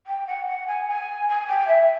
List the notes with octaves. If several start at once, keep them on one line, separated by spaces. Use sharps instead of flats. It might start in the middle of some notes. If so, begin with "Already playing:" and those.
G5
F#5
F#5
G#5
G#5
G#5
G5
E5